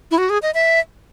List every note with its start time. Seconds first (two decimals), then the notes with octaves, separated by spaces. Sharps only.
0.11 E4
0.18 F#4
0.30 G#4
0.42 D#5
0.54 E5